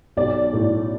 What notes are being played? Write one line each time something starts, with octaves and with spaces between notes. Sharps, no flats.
B1 D5
A2